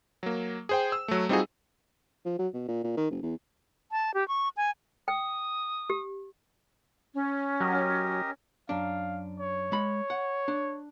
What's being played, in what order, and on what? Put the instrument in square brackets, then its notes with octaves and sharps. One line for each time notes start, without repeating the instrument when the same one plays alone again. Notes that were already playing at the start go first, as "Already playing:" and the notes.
[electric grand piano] F#3 A#3
G#4 C5 G5
E6
F#3 A3
G3 C4 D#4 F4 F#4 G#4
[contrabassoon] F3
F#3
B2
A#2
A#2
D#3
F#1
E2
[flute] A5
G4
C#6
G#5
[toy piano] G5 [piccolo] D#6
[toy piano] G4
[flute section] C#4
[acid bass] F#3 [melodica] G4 A#4 D#5
[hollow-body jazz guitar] F#2 D4 [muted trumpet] F5
[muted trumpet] C#5
[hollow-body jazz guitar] G#3 B5
F#5
D4